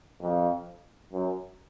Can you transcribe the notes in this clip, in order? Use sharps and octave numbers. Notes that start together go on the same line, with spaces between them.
F2
F#2